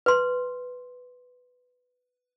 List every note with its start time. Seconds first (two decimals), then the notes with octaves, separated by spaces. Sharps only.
0.06 B4 C6